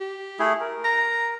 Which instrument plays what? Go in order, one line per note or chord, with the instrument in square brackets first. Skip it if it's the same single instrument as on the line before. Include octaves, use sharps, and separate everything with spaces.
[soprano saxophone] G4
[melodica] A3 E4 G#4
A#4
[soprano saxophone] A#5